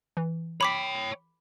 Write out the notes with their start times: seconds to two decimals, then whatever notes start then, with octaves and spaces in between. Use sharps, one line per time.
0.17 E3
0.61 C#5 G5 B5 D6 B6